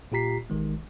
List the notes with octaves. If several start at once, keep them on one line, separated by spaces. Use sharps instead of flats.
A#2 F4 G4 A#5 B6 C7
A1 D#3 G#3